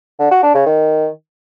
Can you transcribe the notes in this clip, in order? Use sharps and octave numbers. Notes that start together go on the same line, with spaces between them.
D3
F#4
D4
C#3
D#3